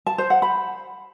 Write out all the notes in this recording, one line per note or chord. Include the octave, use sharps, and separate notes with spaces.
A5
C5
F#5
B5